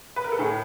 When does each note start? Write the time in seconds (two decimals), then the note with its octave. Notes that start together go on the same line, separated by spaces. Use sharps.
0.16 B4
0.24 A#4
0.32 A4
0.39 A2 G#4